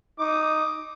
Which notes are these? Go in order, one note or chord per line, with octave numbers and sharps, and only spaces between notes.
D#4 D6 D#6